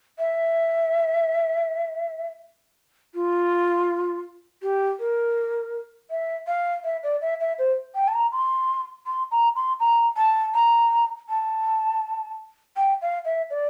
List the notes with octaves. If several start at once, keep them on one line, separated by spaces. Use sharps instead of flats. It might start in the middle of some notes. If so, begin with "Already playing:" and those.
E5
F4
G4
A#4
E5
F5
E5
D5
E5
E5
C5
G5
A5
A#5
C6
C6
A#5
C6
A#5
A5
A#5
A5
G5
F5
E5
D5